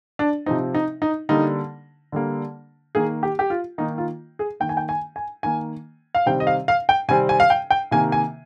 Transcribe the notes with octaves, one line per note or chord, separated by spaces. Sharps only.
D4
C3 F3 C4 D#4
D#4
D#4
D3 G3 A#3 D#4
D3 G3 A#3
D#3 A#3 G#4
G4
G4
F4
D#3 A#3 D#4
F4
G#4
D#3 A#3 G5
G#5
G5
G#5
G#5
D#3 A#3 G#5
F5
C3 D#3 G3 C4 G5
D#5
F5
F5
G5
C3 D#3 G3 C4 G#5
G#5
F5
G5
G5
C3 D#3 A#3 G#5
G#5